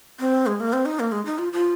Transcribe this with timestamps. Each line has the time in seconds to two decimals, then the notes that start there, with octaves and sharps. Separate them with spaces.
0.20 C4
0.46 G#3
0.60 A#3
0.73 C4
0.86 D#4
1.00 A#3
1.12 G#3
1.26 D#4
1.38 F4
1.53 F4